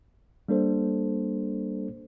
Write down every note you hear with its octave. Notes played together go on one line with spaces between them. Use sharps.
G3 A#3 D4 A4 C5